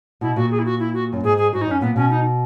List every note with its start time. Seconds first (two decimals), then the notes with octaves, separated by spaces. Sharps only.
0.21 B2 E4
0.36 A#2 F#4
0.51 G#4
0.59 E4
0.65 F#4
0.80 E4
0.94 F#4
1.13 F#2
1.24 G#2 G#4
1.38 G#4
1.53 G#2 F#4
1.62 D#4
1.67 F#2 C#4
1.81 A#2 B3
1.96 B2 C#4
2.10 D#4